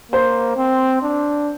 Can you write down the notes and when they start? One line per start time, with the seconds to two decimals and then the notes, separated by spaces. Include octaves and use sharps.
0.12 A#3 C5
0.57 C4
1.03 D4